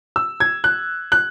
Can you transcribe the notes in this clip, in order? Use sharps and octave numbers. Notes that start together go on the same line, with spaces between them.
E6
G#6
F#6
F#6